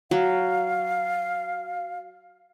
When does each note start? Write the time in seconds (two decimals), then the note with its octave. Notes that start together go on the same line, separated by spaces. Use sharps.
0.11 F#3 F5